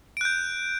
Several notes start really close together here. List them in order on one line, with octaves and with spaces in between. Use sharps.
D7 F#6 G6